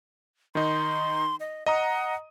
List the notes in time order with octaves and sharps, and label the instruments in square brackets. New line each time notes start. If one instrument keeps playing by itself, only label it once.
[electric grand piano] D#3 D#4 [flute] C6
[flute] D#5
[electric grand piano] D#5 A#5 D#6 [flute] F#5